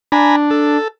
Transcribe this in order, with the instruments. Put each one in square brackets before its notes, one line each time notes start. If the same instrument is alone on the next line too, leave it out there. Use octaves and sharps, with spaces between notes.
[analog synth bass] D4 [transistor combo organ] G#5 A#5 B5
[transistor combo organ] A4